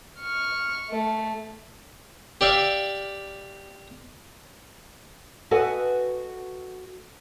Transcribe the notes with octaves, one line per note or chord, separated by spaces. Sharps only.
C#6 F6
A3
G4 D5 E5 F5
F#4 A4 B4 D#5 F#5 G#5